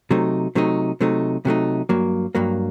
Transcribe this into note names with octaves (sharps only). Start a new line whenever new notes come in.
C3 F#3 A3 D#4
C3 F#3 A3 D#4
C3 F#3 A3 D#4
C3 F#3 A3 D#4
G2 F#3 A#3
G2 F#3 A#3